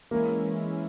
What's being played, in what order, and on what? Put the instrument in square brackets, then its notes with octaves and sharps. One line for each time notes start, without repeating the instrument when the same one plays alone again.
[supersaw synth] E3 G#3 C#4 E4 [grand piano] A#3